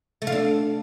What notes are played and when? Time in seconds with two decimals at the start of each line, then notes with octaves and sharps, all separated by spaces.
0.22 A3
0.27 F4
0.32 D4